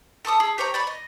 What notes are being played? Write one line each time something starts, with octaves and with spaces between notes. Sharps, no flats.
A4 A5 D6 D#6
G#4
G4 C5 C#5 A#5
D5 B5 C#6
D#5